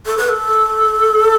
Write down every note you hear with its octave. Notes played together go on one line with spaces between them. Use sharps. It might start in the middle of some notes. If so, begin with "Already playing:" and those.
A4
B4
A4